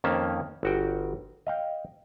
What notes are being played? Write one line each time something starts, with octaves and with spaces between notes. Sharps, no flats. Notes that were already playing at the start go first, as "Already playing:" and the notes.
F2 D#3 A#3 C#4 A5
G1 F#4 G5
D#5 F5 G5